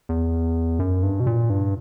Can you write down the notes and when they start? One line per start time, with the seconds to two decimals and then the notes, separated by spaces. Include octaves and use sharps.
0.09 E2
0.79 F#2
1.03 G2
1.20 B2
1.27 A#2
1.50 G2